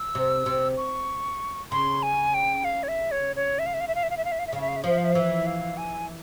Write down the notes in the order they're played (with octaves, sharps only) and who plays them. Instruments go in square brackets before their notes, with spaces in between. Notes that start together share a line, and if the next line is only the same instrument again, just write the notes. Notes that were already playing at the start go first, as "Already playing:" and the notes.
Already playing: [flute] E6
[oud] C3
C3
[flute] C#6
[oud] C#3 [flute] C6
[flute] G#5
G5
F5
C#5
E5
C#5
C#5
E5
F5
E5
F5
E5
F5
E5
F5
E5
F5
E5
F5
E5
[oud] C#3 [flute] F5
[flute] E5
F5
E5
[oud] F3 [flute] F5
[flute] E5
F5
E5
F5
[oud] E3 [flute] E5
[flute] F5
G#5